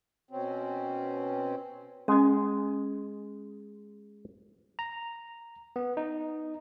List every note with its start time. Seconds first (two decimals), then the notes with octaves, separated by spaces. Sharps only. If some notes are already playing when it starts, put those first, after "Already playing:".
0.31 B2 C4 C#4
2.08 G#3 C#4 D#5
4.79 A#5
5.76 B3
5.97 D#4